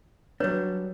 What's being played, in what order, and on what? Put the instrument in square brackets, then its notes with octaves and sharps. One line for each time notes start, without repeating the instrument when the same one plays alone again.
[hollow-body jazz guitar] F#3 G3 D4 [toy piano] B4 C#5